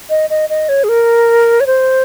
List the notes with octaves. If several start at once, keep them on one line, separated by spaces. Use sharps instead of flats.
D#5
D#5
D#5
C#5
G#4
A#4
C#5
C5